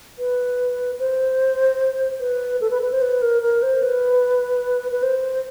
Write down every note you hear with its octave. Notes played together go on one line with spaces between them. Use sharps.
B4
C5
B4
A4
B4
B4
C5
B4
A#4
A#4
C5
B4
B4
C5